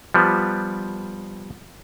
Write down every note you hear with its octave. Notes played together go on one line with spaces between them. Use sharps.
F3 G3 B3